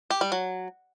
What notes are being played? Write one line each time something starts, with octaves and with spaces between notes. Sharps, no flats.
G4
G3
F#3